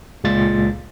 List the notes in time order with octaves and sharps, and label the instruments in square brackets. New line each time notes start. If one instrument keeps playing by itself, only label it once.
[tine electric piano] C#2 A#2 G#3 F4 A6